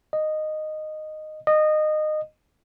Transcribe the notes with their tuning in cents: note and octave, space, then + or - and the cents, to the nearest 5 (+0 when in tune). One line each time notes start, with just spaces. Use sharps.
D#5 -10
D#5 -20